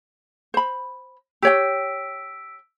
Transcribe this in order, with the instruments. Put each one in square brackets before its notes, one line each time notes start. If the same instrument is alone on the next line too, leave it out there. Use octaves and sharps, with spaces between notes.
[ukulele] C5 B5
[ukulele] G4 C#5 G5 [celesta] E6 B6 D7